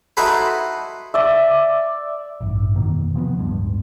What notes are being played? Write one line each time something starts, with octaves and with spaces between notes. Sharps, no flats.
D#4 E4 F#4 A4 B4 C5
D5 E5
A1 G2
F2 B2 D#3 A#3
C3 F3 G#3 B3
D1 G2 G#3